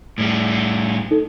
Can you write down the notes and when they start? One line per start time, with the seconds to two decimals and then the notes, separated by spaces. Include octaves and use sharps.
0.18 A2 G3
1.11 D#4 A4